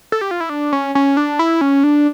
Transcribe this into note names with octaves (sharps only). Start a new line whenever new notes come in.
A4
G4
F4
E4
D4
C#4
C#4
D4
E4
C#4
D4